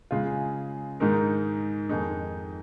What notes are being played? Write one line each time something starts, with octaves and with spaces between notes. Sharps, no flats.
C#3 G#3 F4
G#2 D#3 G#3 D#4 A#4
F2 D#3 G#3 D#4